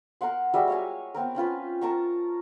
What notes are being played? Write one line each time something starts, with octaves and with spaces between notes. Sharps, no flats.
A#4 F5 F#5 C6
G3 G#3 F#4 E5
C#5 F5 G#5
B3 C4 A#4
C4 C#4 F4 B4
A#4 A5 A#5 C#6